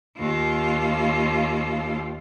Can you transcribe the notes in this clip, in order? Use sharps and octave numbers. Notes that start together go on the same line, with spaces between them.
D#2 F4